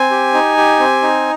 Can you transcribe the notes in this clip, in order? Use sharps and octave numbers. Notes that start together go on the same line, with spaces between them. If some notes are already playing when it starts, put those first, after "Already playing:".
Already playing: C4 G#5
G4
D#4
G4
C4
D#4